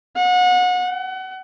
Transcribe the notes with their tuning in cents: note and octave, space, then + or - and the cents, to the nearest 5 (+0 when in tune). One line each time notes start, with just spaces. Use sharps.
F#5 -30
F#5 +30